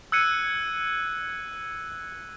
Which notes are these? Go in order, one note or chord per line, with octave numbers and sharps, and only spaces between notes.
E6 F#6 G#6 C#7 D#7